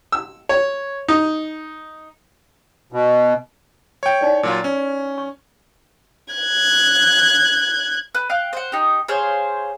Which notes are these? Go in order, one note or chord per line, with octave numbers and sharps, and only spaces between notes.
E6
C#5
D#4
B2
C#5 G5
D#4 E4 D5
A#2 F#3 F4
C#4
C#6
F#6 G#6
B4
F5 G5 F#6
C5 F#5
D#4 G4
G#4 C5 C#5 F5